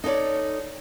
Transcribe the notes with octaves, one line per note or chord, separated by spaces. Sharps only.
D#4 A4 A#4 C#5 D5